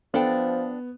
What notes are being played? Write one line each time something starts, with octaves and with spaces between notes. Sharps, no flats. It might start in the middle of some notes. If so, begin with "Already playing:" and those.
F3 B3 D4 A4 G5